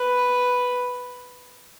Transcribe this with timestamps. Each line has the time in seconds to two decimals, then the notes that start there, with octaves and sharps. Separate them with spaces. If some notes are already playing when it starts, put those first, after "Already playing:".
Already playing: B4